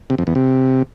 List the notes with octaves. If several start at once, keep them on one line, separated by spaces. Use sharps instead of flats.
C3
F2
E2
C3